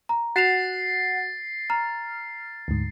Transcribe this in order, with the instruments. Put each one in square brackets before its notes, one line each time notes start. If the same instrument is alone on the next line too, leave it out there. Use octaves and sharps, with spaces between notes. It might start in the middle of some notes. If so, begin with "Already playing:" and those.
[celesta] A#5
[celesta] F#4 E7 F7 [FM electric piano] F#5 [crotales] A6 C7
[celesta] A#5 [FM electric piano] F6
[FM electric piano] D2 G#2